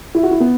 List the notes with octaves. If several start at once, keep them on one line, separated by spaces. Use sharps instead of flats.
E4
F#4
E4
B3